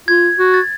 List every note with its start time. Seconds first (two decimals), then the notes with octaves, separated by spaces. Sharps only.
0.08 F4 G#6
0.39 F#4
0.54 A6